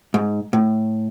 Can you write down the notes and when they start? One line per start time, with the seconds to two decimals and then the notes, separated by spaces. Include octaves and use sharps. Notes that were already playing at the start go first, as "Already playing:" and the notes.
0.14 G#2
0.53 A2